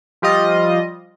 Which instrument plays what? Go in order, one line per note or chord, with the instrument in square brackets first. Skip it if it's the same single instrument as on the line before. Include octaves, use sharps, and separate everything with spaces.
[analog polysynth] F3 G3 F4 D#5